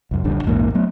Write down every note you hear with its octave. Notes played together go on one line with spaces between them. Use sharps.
C2 F#2
D#1 A#1 G2 D3
A#1 E2 G#2 A#3
F#3 A3 B3